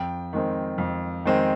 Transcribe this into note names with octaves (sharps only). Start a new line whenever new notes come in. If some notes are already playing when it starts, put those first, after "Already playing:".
Already playing: F2 G5
D#3 G#3 C4
F2
D#3 G#3 C4